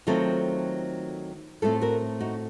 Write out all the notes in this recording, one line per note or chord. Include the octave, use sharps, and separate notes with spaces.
D#3 F#3 A3 C4 F4 A4
A2 A3 C4 F4 A4
F#4 A#4
D#4 F#4